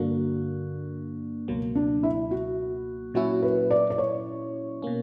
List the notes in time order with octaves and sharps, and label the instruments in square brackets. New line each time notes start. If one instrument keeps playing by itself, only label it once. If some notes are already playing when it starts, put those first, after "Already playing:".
Already playing: [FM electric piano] G2 D3 A#3 D4 [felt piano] F#4
[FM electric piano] C#2 B2 F#3 A#3
[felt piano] D4
E4
F#4
[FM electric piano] A#2 F#3 C#4 E4 [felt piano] F#4
[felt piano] B4
D5
D5
C#5
[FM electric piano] B2 A#3 C#4